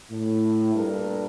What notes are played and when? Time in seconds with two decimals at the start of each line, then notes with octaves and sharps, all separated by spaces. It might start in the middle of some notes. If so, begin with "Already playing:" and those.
0.10 A2
0.75 G2 A#2 A4 A#4